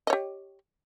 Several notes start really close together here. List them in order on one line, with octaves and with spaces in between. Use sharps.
D#5 C#5 G4